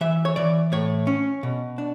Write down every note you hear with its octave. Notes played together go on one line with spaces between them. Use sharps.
E3 E5
C#5
E3 D5
A2 C#5
C#4
B2
D4